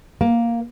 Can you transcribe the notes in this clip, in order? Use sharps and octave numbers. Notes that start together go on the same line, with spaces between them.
A#3